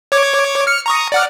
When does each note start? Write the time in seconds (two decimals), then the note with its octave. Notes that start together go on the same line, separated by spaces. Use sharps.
0.12 C#5 D6 G#6
0.67 F6 C#7
0.86 A#5 C#6 D#6
1.12 D5 F#5 F6